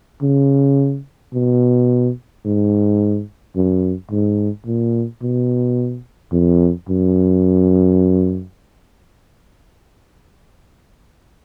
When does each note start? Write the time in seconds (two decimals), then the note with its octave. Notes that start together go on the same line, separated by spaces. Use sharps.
0.22 C#3
1.34 B2
2.45 G#2
3.56 F#2
4.11 G#2
4.66 A#2
5.22 B2
6.32 F2
6.89 F#2